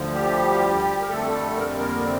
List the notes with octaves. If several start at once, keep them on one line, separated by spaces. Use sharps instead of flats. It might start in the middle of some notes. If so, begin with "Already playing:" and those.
Already playing: D2 D3 F3
G3 G4
A#4
F2 D3 G3 A3 A4
A#4
A#3 A#4
C3 C4